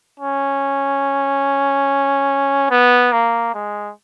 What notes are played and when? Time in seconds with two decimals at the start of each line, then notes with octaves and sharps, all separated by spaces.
0.20 C#4
2.70 B3
3.12 A#3
3.54 G#3